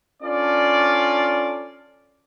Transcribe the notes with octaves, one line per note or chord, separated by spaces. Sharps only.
C#4 D4 F4 A4 D5